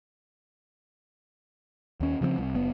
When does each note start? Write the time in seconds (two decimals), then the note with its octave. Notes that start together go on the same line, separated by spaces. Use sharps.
2.00 D#2 C#4
2.21 C#3 F3 A3 C4
2.38 C2
2.55 F#1 B3